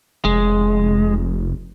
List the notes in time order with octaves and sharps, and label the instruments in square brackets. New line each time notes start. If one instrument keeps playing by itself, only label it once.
[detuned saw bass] F1 [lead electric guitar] G#3